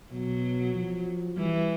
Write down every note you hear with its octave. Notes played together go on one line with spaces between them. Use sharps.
B2 F#3
F3
E3 G3